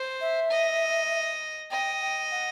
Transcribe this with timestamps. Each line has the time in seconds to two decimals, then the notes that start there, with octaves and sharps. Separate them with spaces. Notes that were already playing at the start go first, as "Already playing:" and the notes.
Already playing: C5
0.21 E5
0.50 D#5
1.71 D#5 G5
2.01 G5
2.31 F#5